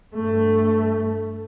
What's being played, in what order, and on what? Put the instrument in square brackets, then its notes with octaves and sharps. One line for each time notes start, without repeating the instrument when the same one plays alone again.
[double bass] G2 A3